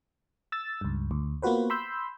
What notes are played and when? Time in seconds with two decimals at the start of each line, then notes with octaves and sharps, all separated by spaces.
0.52 E6 A6
0.81 C#2 G2
1.11 D2
1.42 A#3 B3 F4 F#4 B4 C5
1.70 B5 C6 E6 G6